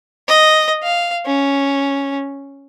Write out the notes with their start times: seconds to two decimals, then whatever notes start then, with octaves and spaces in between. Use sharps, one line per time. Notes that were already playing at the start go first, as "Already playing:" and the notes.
0.28 D#5
0.83 F5
1.25 C#4